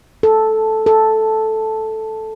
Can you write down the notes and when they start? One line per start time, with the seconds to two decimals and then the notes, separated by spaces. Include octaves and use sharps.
0.23 A4
0.86 A4